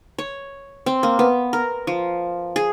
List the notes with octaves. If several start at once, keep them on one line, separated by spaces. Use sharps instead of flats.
C#5
C4
A#3
B3
A#4
F3
G#4